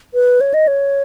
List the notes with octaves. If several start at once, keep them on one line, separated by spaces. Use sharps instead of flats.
B4
C#5
D#5
C#5